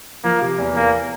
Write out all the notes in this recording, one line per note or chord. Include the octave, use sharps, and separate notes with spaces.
F3 A#3
C3
E2
E2 A#3